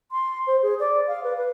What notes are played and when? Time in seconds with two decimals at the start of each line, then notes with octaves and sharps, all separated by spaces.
0.11 C6
0.47 C5
0.62 G#4
0.80 D5
1.07 F5
1.24 B4
1.37 B4